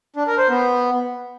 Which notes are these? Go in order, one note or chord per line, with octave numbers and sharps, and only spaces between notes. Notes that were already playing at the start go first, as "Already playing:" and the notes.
D4
A#4
C5
B3